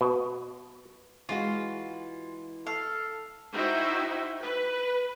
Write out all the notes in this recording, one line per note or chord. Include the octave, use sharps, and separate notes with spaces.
B2
E3 G#3 F4 F#4
A4 F5
D#4 E4 F#4 C5 E5 G5
B4